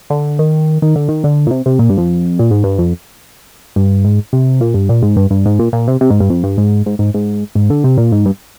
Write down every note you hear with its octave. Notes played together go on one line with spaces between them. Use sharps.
D3
D#3
D#3
D3
D#3
D3
A#2
C3
C3
A#2
G2
F2
A#2
G#2
G2
F2
G2
G#2
C3
A#2
G2
A#2
G#2
G2
G2
G#2
A#2
A#2
C3
C3
G#2
G2
F2
G2
G#2
G#2
G#2
G#2
G#2
D3
C3
A#2
G#2
G2